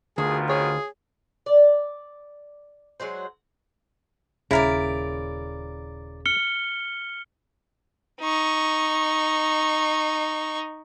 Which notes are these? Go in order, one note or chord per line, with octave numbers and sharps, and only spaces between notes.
D2 B2 D#3 F4 G#4
G#4 C#5
D5
F#3 G#3 F#4 C5
D#1 C#3 E4 A#4 D5
F6 C#7 G7
D#4 C#6